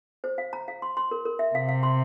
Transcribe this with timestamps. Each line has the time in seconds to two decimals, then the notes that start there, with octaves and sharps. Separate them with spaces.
0.24 C5
0.38 F5
0.53 A#5
0.68 F5
0.82 C6
0.97 C6
1.11 A#4
1.25 A#4
1.39 E5
1.55 C3 F5
1.69 F5
1.83 C6